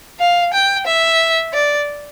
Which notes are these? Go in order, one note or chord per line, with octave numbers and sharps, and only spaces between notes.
F5
G5
E5
D5